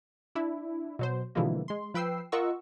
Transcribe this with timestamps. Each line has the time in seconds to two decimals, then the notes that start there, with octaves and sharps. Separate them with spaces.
0.35 D4 E4
0.99 B2 F#3 C5
1.35 B2 D3 E3 F3 G#3 A#3
1.68 G#3 C6
1.94 F3 B4 G5 E6 C7
2.32 F4 A#4 D#5 F#5 C#6 E6